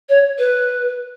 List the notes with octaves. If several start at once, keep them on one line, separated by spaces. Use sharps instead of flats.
C#5
B4